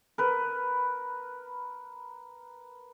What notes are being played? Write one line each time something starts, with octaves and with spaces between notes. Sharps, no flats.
A#4 B4